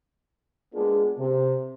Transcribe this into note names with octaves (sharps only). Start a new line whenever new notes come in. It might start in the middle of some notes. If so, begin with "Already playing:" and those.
G#3 A#3 B3 D4 F4 G#4
C3